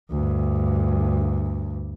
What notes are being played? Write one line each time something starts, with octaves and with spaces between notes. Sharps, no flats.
D2 G2